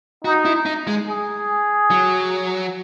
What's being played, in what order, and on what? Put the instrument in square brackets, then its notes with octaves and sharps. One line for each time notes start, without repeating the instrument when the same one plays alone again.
[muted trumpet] D#4 [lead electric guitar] F#4
[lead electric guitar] E4
D#4
G#3
[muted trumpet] G#4
[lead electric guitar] F#3